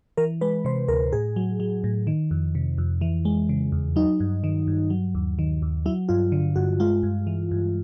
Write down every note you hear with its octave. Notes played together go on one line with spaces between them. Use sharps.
E3 A#4
G#3 B4
C3 C5
D2 A#4
A2 G#4
F#3
F#3
A2
D#3
F2
C3
F2
E3
G#3
C#3
E2
F#3 D#4
G2
D#3
G2
F#3
D#2
D#3
D#2
F#3 E4
G2 F4
D3
G2 F#4
G#3 F4
G2
E3
G2